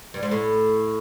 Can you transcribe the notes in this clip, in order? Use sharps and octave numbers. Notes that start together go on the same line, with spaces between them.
G2
G#2
A2